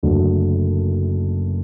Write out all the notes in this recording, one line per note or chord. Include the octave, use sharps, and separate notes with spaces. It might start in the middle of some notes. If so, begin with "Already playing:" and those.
F#1 F#2 D3 F#3 A3